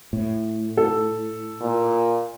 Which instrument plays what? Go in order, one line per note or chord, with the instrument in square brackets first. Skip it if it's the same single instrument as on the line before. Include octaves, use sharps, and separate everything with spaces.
[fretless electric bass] A2
[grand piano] A4
[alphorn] A#2